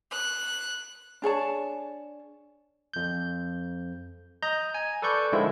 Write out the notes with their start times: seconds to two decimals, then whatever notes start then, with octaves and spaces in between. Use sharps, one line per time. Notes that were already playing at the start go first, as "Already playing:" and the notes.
0.12 F#6
1.22 D4 G#4 C#5 A5
2.94 F2 G6
4.43 D#5 A#5 G6
4.74 G#5
5.02 A4 B4 D5 C#6 G6
5.32 G#2 D3 D#3 F3 G#3 E4